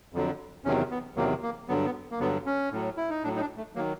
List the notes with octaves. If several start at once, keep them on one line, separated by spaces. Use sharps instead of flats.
F2 D3 F#3
E2 C3 D#3 F#3 C#4
B3
E2 C3 D#3 F#3 A#3
A#3
G2 D3 F#3 B3
B3
A#3
G2 D3 F#3 B3
C#4
A2 F#3
E4
D#4
A2 F#3 D4
D#4
D4
A3
D#3 F#3 A#3